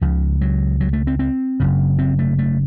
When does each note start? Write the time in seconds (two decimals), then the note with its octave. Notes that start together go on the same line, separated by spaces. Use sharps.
0.01 C#2 C#3 F3
0.41 F#3
0.81 F#3
0.93 A3
1.07 C4
1.19 C4
1.60 F#1 F#2 C#3
1.99 C4
2.19 A3
2.39 A3